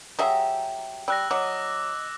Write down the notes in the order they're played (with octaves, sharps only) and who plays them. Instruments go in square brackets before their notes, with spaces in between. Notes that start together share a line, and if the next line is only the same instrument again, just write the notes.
[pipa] F#3 G#4 E5 [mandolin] G4 A#5
[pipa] G3 [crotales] E6 F#6 A#6
[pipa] F#3 [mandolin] D#5 [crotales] D6